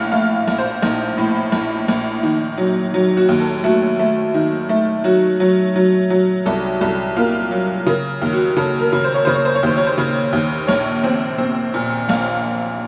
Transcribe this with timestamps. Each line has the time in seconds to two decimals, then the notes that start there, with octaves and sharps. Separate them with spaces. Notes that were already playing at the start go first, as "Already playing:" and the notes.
Already playing: A#1 A2 F5 F#5
0.12 A3 F5
0.48 A#1
0.58 C5
0.82 A#1 D#4
1.18 A2
1.52 A#1
1.88 A#1
2.23 D#3
2.58 F#3
2.94 F#3
3.17 F#4
3.29 D#2
3.40 A4
3.64 A3 F#4
3.99 A3
4.34 D#3
4.69 A3
5.04 F#3 F#4
5.40 F#3
5.76 F#3
6.10 F#3
6.46 C2 A4
6.81 C2 A4
7.16 A#3 F4
7.51 F#3
7.87 C#3 A#4
8.22 D#2
8.33 F#4
8.57 C#3 A4
8.80 A#4
8.93 C#3
9.04 C5
9.14 C#5
9.25 C#3 C5
9.35 C#5
9.45 C5
9.55 C#5
9.63 D#2 C5
9.77 C#5
9.87 C5
9.98 C#3
10.33 D#2
10.67 A#1 C#5
11.04 C4
11.38 C4
11.74 A#2
12.09 A#1 F5